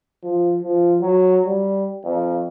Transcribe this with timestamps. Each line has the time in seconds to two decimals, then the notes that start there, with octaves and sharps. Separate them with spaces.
0.23 F3
0.63 F3
1.01 F#3
1.46 G3
2.05 F2